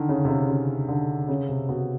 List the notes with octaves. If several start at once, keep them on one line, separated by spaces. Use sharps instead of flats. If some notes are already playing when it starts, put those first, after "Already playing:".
Already playing: D3 D#3
C#3
C3
C#3
C#3
D3
C#3
C3
B2